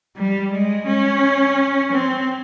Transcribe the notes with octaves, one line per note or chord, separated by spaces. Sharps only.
G3
G#3
C#4
C4